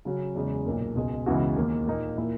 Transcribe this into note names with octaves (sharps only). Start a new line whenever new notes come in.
C#3 F#3 C#4 F#4
E2 C#3 G#3
B1 A#2 A#3
C#2 B2 G#3
C#2 C#3 E3 B3 F#4
D#2 D#3 A#3
A#2 A#3 D#4
A#2 A#3 E4 A#4